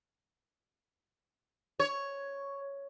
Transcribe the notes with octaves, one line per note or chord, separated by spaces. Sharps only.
C#5